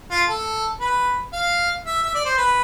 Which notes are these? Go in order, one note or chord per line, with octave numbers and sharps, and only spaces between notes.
F4
A4
B4
F5
E5
E5
D5
C5
B4